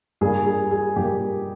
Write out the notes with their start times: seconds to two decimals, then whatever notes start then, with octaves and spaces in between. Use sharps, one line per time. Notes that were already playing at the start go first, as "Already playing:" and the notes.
0.21 G2 G3 A#3 G#4
0.46 G#4
0.71 G#4
0.96 G2 G3 A#3 G4